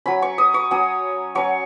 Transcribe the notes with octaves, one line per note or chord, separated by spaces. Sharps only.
F#3 C#4 B5
C#6
D#6
C#6
F#3 C#4 D#6
F#3 C#4 C#6